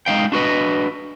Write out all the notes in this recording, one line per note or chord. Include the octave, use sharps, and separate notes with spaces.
G#3 D#4 F5 G5
D4 F#4 B4 D#5